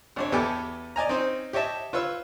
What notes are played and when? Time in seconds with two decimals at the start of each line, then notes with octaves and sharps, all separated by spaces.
0.16 G#1 D4 C#5
0.32 E2 B3 G4 A4 G#5 D6
0.96 D5 D#5 G#5 A#5
1.09 C4 C#4 D#4 C5
1.53 G4 C#5 D#5 E5 A5
1.93 F4 B4 C#5 E6